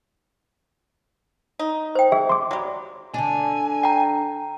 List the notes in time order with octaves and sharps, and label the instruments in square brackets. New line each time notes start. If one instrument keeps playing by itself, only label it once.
[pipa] D#4
[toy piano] C5 G5
[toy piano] G#4 [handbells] E5
[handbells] C6 D6
[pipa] F#3 G3
[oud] D3 D4 [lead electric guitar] G#5
[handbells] G5 A#5